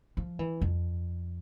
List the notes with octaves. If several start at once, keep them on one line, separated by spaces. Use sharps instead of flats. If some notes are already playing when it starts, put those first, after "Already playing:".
F3
E3
F2